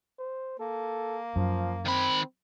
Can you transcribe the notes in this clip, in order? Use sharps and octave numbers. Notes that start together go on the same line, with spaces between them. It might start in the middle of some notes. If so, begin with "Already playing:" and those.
C5
A#3 A4
F#2 F3
D#3 C4 B5